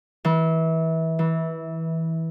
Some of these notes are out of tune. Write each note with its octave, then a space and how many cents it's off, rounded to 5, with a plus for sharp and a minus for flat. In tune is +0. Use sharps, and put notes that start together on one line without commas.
E3 -25
E3 -15